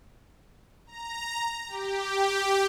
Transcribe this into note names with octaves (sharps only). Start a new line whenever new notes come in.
A#5
G4